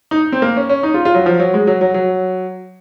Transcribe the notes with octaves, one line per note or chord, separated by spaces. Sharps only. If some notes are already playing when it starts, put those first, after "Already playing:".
D#4
C4
A#3
C#4
C#4
D#4
F4
F4
F#3
F3
F#3
G#3
F#3
F#3
F#3